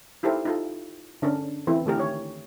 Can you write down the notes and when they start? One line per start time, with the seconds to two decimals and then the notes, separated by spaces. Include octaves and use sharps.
0.23 D#4 E4 G4 A4 A#4 C5
0.45 D#4 F4 A4
1.22 D3 C#4 D4 A#4
1.67 E3 C4 E4
1.86 D3 A3 G4 A#4
1.98 D#3 C#5